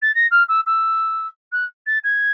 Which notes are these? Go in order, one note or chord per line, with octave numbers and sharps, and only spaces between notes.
A6
A#6
F6
E6
E6
F#6
A6
G#6